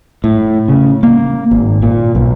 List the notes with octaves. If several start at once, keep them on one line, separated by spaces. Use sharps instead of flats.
A2
C#3
A#3
G#1
A#2
B1